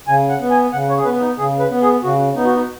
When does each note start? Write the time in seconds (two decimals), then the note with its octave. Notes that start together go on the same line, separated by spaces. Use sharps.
0.07 C#3 G#5
0.29 F#5
0.41 B3
0.50 G#5
0.72 C#3 F#5
0.89 C#5
0.98 G#4
1.05 B3 B4
1.21 D#4
1.38 C#3 G#4
1.59 B4
1.70 B3
1.82 G#4
2.03 C#3 F#4
2.35 B3 D#4
2.45 F#4
2.54 D#4